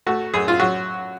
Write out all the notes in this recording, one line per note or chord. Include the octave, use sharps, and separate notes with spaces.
A3 F#4
F#2 G#4
F4
F#3 F#4